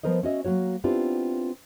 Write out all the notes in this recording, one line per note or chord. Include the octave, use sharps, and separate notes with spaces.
F3 B3 A#4 C5 D#5
C#4 F#4 D#5 E5
F#3 A#3 F#4 C#5
B3 C4 D4 E4 F4 G4